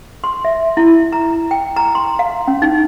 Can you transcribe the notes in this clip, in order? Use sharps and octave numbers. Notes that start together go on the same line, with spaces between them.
C6
E5
E4
A#5
G5
A#5
C6
F5
C#4
D#4